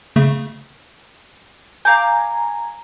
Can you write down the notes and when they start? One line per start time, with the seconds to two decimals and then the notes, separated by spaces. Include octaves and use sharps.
0.16 C#3 A3
1.85 F5 G#5 A#5 D6 G6